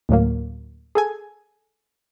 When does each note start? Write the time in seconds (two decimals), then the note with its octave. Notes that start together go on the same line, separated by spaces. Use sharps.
0.09 D2 A2 F#3 A#3
0.95 G#4 A4 G#5